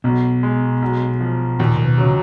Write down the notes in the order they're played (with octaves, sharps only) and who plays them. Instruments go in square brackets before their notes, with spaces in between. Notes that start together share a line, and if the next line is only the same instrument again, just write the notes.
[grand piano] B1 [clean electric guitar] B2
[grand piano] G#3
B1
F3
[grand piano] D#2 [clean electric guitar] A#2
[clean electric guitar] A#2
B2
[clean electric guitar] C#3 [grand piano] F#3